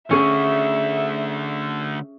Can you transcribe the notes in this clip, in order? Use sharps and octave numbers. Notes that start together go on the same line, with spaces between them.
D3 A3 C#4 G#4 E5